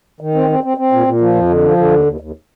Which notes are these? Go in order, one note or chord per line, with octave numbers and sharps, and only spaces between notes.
D#3
C4
C4
C4
C4
A#2
A#2
F3
F2
D3
F3
D3
D#2
D#2
D#2